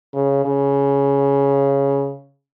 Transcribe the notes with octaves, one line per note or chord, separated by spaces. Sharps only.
C#3
C#3